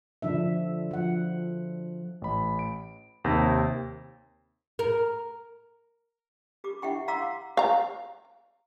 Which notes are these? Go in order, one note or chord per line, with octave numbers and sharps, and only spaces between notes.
D3 F3 D4 E5
F3 F#5
A1 B5
D7
D#2 C3 E6 G6 A#6
A#4
G4 D6
E4 E5 F#5 G5 C#6
F5 F#5 A#5 C6 D6 E6
F5 A#5